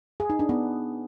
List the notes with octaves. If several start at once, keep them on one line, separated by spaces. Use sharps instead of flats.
G#4
D#4
D4
B3